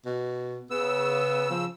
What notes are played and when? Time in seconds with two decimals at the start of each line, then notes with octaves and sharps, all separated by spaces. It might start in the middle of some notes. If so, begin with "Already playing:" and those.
0.06 B2
0.70 C#3 B3 E6
1.51 F3